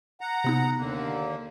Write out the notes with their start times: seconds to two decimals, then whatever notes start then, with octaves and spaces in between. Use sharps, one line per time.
0.21 F#5 A#5
0.44 C3 B3 D#4
0.78 D#2 D3 A#3